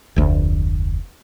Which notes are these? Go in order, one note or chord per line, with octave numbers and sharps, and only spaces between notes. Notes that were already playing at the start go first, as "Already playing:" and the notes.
F1 D2